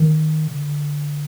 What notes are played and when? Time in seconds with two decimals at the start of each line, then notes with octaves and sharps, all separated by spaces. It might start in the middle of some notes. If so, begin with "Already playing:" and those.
Already playing: D#3
0.47 C3
0.53 D3